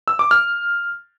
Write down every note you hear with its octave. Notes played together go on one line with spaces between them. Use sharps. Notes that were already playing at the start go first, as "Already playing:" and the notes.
E6
D6
F6